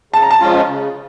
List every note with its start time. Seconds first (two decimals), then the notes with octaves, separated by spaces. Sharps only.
0.13 C#3 A5
0.22 A#5
0.31 A5
0.40 F3 G#3 C#4 F4
0.67 C#3